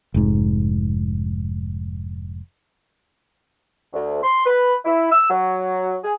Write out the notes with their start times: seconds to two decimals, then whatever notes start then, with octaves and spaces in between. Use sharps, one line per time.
0.14 F1 G#2
3.93 D2
4.22 C6
4.46 B4
4.85 E4
5.11 E6
5.29 F#3
6.04 G#4